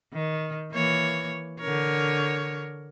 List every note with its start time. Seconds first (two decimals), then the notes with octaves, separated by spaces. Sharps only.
0.13 D#3
0.72 E3 A#3 C#5
1.60 D3 A#4 C#5